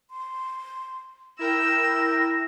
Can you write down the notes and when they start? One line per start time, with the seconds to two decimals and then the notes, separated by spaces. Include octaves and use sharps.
0.11 C6
1.39 E4 A#4 G5 E6 A#6